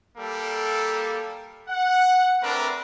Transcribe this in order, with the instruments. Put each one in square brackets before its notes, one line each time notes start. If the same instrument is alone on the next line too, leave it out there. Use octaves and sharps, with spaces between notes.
[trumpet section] G3 A#3 A4
F#5
A3 C4 D4 A#4 B4